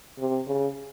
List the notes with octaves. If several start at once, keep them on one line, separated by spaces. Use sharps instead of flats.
C3
C#3